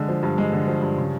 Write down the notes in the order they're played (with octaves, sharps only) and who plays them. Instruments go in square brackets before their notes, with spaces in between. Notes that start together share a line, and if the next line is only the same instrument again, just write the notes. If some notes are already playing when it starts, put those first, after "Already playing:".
Already playing: [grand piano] D3 G#3
F3
G2
G#3
D3
F3
G2
C#3